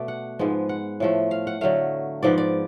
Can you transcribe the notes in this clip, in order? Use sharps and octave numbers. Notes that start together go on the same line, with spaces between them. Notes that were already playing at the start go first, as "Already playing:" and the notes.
Already playing: B2 A3 D5
F#5
G#2 F3 G#3 B3
F#5
A2 F3 A3
F5
F#5
D3 F#3 A3 F5
G#2 F3 B3 D5
D5